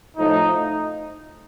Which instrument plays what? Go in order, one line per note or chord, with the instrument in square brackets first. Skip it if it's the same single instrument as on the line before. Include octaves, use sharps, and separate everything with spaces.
[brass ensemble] A2 F3 A3 D#4